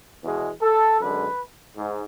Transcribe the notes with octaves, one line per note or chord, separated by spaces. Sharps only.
E2 B2 G#3
A4
F#2 D3 G#3 B4
G#2